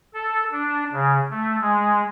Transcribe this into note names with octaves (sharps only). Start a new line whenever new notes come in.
A4
D4
C#3
A3
G#3